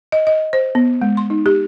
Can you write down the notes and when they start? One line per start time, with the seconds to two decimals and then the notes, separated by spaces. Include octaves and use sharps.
0.12 D#5
0.27 D#5
0.53 C5
0.75 B3
1.02 G#3
1.17 C6
1.30 D#4
1.46 G4